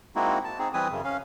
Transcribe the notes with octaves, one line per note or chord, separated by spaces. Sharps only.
G#3 A#3 C4 D#4 E4 F#4
A5
C4 D#4 G#4
E3 G3 C4 B4 G#5 D#6
F#2 C#3
C#4 F5